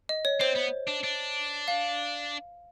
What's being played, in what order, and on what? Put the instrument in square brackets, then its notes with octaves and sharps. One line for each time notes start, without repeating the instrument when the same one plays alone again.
[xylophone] D#5
C#5
[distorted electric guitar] C4 [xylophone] C5
[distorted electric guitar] B3
D4
D4
[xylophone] F5